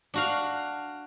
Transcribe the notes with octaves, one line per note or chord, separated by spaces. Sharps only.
D4 F#4 F5